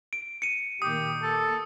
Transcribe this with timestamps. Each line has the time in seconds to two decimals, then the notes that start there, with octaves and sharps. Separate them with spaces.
0.13 D7
0.42 C#7 D#7
0.82 A#2 D#3 A#3 G4 D#6
1.23 A4